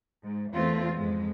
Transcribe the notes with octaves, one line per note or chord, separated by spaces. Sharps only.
G#2
E2 A3 C4 F4
F2 G#2 G#3